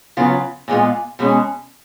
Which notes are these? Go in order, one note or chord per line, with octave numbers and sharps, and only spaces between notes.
C#3 F#3 B3 F4
A#2 G#3 B3 F4
B2 G#3 C#4